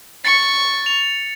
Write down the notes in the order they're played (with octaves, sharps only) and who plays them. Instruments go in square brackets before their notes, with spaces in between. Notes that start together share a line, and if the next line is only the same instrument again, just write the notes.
[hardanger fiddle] C#6 [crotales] A6 C#7
[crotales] F7